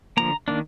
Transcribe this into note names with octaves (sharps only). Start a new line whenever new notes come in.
D3 F3 A#3 A#5
D#3 A#3 D4